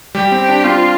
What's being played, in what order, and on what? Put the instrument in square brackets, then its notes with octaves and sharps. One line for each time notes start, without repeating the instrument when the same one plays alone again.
[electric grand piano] G3 [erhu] G4
[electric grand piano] C4
D4
[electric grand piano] C4 [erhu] F4